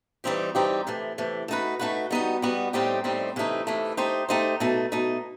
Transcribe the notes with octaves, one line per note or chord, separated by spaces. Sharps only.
E3 G3 C4 D#4 G4
E3 G3 C4 D#4 G4
C3 E3 A3
C3 E3 A3
A3 D#4 F#4 B4
A3 D#4 F#4 B4
G3 B3 D#4 F#4
G3 B3 D#4 F#4
A2 G3 C4 D#4 G4
A2 G3 C4 D#4 G4
C3 E3 A3 D#4
C3 E3 A3 D#4
A3 D#4 G4 C5
A3 D#4 G4 C5
B2 A3 D#4
B2 A3 D#4